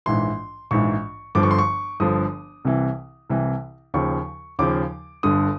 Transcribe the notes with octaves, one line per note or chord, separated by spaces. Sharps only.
A#1 G#2 E3 C6
A#1 G#2 E3 C#6
G1 G2 D3 F3 D6
C#6
C6
C#6
G1 G2 D3 F3 D#6
C2 C3 E3
C2 C3 E3
D#2 C#3 F3 C#6
D#2 C#3 F3 D6
G1 G2 D3 D#6